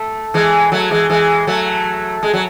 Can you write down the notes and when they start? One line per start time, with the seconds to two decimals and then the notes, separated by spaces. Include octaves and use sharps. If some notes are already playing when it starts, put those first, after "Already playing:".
Already playing: A3
0.34 E3 G#3
0.72 F#3 A3
0.91 E3 G#3
1.09 E3 G#3
1.47 F#3 A3
2.23 G#3
2.34 F#3